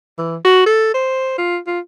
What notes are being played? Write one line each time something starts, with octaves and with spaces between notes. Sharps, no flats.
E3
F#4
A4
C5
F4
F4